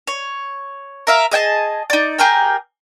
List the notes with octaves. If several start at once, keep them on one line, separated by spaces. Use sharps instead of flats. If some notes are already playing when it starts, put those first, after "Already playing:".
C#5
A#4 E5 F5
G#4 D#5 G5 A5
D#4 D5
G4 G#4 A#4 G5